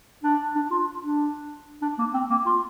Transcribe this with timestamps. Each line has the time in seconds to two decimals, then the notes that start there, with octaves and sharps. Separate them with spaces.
0.24 D4
0.56 D4
0.71 F4
1.03 D4
1.82 D4
1.99 A#3
2.14 C4
2.30 A#3
2.46 F4